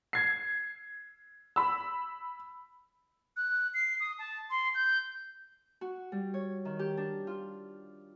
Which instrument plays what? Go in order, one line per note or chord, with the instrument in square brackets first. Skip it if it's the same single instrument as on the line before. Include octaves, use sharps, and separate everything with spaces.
[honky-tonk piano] G#6 C7
B5 E6
[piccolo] F#6
C7
D#6
A5
C6
G6
[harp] F#4
G3
C#5
D#3
G4
D4
F4